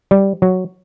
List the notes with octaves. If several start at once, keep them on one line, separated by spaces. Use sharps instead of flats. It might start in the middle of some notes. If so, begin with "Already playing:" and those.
G3
F#3